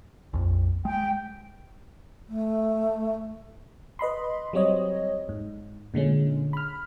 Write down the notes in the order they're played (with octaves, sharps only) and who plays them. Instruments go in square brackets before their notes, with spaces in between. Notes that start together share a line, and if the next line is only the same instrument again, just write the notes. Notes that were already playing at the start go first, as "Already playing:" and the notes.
[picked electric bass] A#1 F2
[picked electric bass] G#3 [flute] G5
[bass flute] A3
[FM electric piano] B4 D#5 B5 C6
F#3 G3 C4 C#5 D#5
G#2
A#2 D3 G#3 C#4
B5 F6